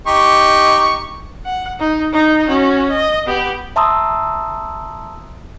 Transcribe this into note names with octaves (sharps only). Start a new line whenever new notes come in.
D#4 G4 C#6
F#5
D#4
D#4
C#4 F#4
D#5
B3 G4
E5 A5 A#5 C6 D#6 E6